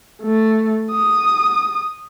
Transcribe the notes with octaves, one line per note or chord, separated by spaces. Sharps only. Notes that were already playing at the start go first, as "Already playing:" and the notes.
A3
D#6